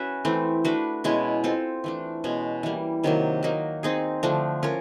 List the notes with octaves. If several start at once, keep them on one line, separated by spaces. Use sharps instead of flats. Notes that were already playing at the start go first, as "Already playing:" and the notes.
Already playing: C#4 F#4 B4 E5
E3 A3 C4
A3 D4 F#4 B4
B2 G#3 C#4 E4
C4 F4 A4
E3 A3 D4
B2 G#3 C#4
E3 G3 A#3
C3 D#3 F#3 A#3
F#3 A#3 D#4
C4 D#4 G#4
D3 F3 A3 D4
C#4 F4 A#4